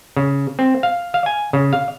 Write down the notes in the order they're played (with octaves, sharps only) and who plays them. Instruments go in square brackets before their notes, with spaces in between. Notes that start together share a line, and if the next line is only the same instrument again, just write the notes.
[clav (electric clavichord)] C#3
C4
F5
F5
G#5
C#3
F5